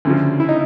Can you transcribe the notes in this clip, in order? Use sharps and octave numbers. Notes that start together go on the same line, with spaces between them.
D2 C#3 F3
E4
D#4